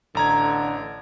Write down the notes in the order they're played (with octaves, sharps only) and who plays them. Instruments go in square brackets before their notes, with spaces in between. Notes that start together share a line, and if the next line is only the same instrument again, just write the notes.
[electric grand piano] A1 A#5 G#6 [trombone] D3